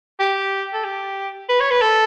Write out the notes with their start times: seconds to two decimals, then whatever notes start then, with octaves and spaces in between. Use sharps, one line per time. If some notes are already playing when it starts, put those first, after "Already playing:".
0.19 G4
0.73 A4
0.84 G4
1.49 B4
1.60 C#5
1.71 B4
1.82 A4